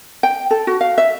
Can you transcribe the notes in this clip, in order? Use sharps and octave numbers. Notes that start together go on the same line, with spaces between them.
G5
A4
F#4
F5
E5